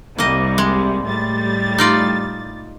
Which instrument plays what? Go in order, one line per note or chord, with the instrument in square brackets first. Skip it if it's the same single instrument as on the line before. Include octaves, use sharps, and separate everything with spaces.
[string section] C2 C3 G3 [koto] A#3 D#5
[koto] G#3
[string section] A2 G3 A6
[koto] D#4 F4 D5